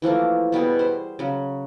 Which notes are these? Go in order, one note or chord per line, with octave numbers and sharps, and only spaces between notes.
E3 F3 A3 A#3
B2 G3 B3 G#4
C5
C#3 F#3